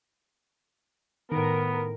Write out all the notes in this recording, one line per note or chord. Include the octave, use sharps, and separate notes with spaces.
A2 D#3 B3 A#4 D7